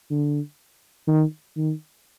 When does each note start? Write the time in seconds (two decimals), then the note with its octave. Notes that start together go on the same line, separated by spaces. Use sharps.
0.10 D3
1.07 D#3
1.57 D#3